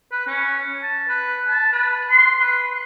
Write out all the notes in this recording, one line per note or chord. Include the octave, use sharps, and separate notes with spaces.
B4
C#4
A5
B4
A5
B4
C6
B4